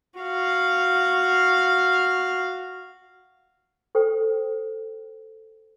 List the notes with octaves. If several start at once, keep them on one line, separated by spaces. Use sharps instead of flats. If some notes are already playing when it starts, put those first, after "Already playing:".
F#4 F5
A4 C5 G5